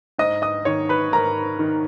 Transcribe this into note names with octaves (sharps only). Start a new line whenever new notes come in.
G#2 D#5 D#6
D#5 D#6
D#3 C#5 C#6
B4 B5
G#2 A#4 A#5
D#3